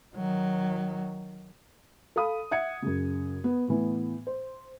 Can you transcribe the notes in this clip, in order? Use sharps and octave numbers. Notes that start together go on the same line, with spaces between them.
D#3 F#3
A4 F5 B5 D#6
E5 F#5 G#6 C#7
F#2 C#3
B3
A2 E3 B3
C5